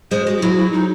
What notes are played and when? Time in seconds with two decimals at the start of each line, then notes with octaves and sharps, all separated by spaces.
0.11 G#3 C5
0.27 G#3 F#4
0.37 F#4
0.42 F#3 E4
0.57 E4
0.73 D#4